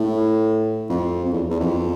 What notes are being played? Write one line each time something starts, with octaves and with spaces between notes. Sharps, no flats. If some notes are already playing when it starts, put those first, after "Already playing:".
Already playing: A2
F2
F2
E2
E2
F2